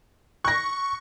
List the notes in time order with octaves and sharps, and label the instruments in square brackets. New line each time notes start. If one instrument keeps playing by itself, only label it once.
[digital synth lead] C#6 [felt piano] F#6 A#6